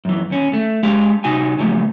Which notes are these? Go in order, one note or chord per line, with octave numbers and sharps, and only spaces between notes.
F#2 E3
D#2 C#4
A3
G#3 G4 F5
C3 D#4 F#4 G#5
C#2 F#2 A#2 F3 G3 A3